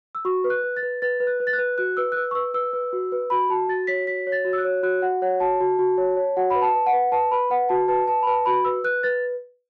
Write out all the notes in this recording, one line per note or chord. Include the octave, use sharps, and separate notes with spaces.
E6
F#4 C#6
B4
F#6
B4
A6
B4
B4 A6
B4
F#6
B4
A6
F#6
B4
F#4 F#6
B4 E6
F#6
B4 E6
C#6
B4 E6
B4 E6
B4
F#4
B4
F#4 B5
F#4 A5
F#4 A6
C#5 B6
F#4 B6
C#5
A6
F#4
E6
F#6
C#5
F#4 F#6
F#4 F#5
C#5 F#5
F#4 A5
F#4
F#4
C#5
C#5
F#4 F#5
B4 B5
A5
B4
F#5
B4
B4 A5
B4 B5
B4 F#5
F#4 A5
B4 A5
B4 A5
B5
B4 A5
F#4 B5
B4 E6
B4 F#6
B4 A6